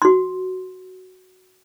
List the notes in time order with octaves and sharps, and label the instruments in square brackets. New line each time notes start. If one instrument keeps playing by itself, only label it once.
[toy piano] F#4 C6